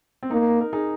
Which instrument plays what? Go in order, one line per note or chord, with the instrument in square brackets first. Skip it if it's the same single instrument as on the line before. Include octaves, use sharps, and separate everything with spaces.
[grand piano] C4
[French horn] A#3 [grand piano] D#4
[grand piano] A#4
D#4 G#4